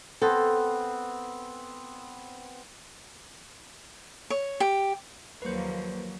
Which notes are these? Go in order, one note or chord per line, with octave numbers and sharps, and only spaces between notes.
B3 C4 A4
C#5
G4
D#2 F3 F#3 A#3 B4 C5